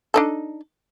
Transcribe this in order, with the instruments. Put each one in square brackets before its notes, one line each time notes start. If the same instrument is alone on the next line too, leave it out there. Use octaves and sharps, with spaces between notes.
[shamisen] D4 D#4 A4